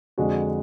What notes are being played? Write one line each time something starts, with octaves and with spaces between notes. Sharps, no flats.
F2 D3 G#3 D4 F#4